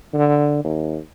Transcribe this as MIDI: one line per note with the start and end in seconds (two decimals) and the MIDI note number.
0.14 0.61 50
0.64 0.98 39